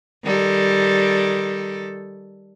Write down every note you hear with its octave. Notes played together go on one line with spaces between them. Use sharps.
D#3 G3 A4